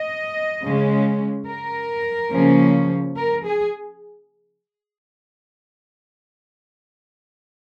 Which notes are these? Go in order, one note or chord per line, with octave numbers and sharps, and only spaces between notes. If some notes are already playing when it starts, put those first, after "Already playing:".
Already playing: D#5
C#3 G#3 C#4
A#4
C#3 F3 A#3 C#4
A#4
G#4